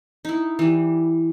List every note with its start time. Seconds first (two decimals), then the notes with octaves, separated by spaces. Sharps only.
0.25 D#4 E4
0.59 E3 G3